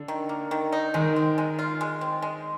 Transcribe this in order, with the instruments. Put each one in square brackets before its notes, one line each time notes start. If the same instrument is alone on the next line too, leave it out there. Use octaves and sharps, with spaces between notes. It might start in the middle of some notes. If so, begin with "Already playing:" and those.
Already playing: [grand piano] D3
[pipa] D#3
A#3
D#3
D#4
[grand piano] D#3 [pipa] G#3
[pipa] C4
G#3
F4
G#3
C4
G#3